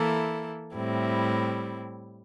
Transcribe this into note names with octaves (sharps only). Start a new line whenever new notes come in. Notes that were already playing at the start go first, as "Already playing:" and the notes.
Already playing: E3 A#3 E4 A4
A2 G3 C4 E4